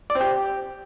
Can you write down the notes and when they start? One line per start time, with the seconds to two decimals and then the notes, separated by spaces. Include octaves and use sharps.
0.10 D5
0.15 C4
0.21 G4